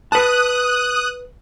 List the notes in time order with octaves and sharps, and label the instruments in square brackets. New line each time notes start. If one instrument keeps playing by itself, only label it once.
[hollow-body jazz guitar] B4 A5 [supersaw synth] D#6 F#6